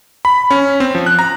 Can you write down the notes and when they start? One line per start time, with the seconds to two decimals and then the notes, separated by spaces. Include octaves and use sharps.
0.25 B5
0.51 C#4
0.80 C4
0.95 F3
1.06 F#6
1.19 A#5